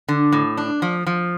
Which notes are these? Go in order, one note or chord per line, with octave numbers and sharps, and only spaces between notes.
D3
A2
D4
F3
F3